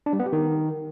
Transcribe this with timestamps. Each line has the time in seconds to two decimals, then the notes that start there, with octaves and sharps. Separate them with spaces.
0.06 D4
0.13 G3
0.19 B3
0.26 G4
0.33 D#3